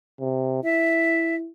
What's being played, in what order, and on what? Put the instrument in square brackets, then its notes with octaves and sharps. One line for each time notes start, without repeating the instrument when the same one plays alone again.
[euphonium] C3
[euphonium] E4 [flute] E5